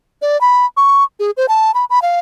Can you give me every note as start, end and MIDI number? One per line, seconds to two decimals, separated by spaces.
0.22 0.39 74
0.41 0.66 83
0.77 1.04 85
1.20 1.31 68
1.37 1.46 72
1.48 1.71 81
1.75 1.85 83
1.90 2.02 83
2.02 2.20 77